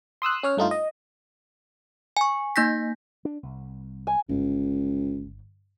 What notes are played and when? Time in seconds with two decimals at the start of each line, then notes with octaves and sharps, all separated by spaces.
0.22 C6 D#6 E6 F#6
0.43 C#4 C#5 F6
0.57 G2 A3 D#4 F4
0.71 D#5
2.17 G#5 C#6
2.56 A#3 D#4 G6 A#6 B6
3.25 D4
3.43 C2
4.07 G#5
4.29 G1 C#2